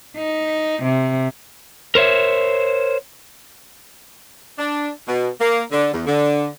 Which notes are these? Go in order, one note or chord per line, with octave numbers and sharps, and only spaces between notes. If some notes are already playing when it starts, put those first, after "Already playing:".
D#4
C3
A#4 C5 C#5 E5
D4
B2
A#3
D3
E2
D3